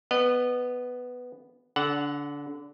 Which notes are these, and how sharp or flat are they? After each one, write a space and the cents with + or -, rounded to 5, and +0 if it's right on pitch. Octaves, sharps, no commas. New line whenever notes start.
B3 +5 D#5 -30
D3 -25 F#5 +0